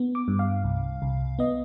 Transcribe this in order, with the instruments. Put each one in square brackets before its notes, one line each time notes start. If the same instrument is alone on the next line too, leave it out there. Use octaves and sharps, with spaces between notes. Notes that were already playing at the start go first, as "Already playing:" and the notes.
Already playing: [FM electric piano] B3
D6
G2
F5
C2
C2
B3 D#5